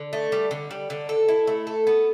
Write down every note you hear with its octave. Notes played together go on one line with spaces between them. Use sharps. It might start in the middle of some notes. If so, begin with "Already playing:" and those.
Already playing: D3
A3
G3
D3
G3
D3
A4
E4
A3
A4
B3